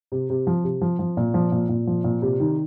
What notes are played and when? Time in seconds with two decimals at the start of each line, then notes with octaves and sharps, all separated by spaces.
0.12 C3
0.30 C3
0.47 F3
0.64 C3
0.81 F3
0.99 F3
1.17 A#2
1.34 F3
1.52 A#2
1.69 A#2
1.87 F3
2.04 A#2
2.22 C3
2.40 D#3